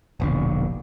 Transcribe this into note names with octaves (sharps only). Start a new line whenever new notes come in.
E1 A#1 D3